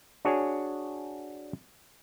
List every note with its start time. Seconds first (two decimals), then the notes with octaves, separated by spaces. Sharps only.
0.25 D4 F#4 G#4 C#5 G#5